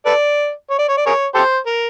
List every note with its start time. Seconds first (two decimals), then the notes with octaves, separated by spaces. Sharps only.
0.06 A4 B4 D5
0.70 C#5
0.79 D5
0.89 C#5
0.97 D5
1.06 G#4 A#4 C#5
1.35 G4 A4 C5
1.66 A#4